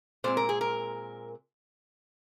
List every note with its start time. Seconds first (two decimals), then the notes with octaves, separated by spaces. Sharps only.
0.24 A#2 G#3 C4 C5
0.37 A#4
0.49 G#4
0.61 A#4